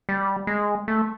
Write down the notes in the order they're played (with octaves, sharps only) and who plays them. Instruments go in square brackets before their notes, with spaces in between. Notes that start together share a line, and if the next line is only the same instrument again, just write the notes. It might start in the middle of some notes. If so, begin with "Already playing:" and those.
[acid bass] G3
G#3
A3